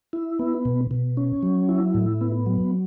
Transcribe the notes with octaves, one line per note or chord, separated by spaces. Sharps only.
E4
B3
B2
B2
C#4
F#3
E4
A2
B3
F#3